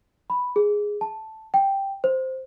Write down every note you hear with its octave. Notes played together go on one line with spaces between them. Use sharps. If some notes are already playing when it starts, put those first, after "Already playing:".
B5
G#4
A5
G5
C5